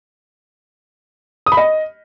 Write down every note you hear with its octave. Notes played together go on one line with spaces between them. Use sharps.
D#6
B5
D#5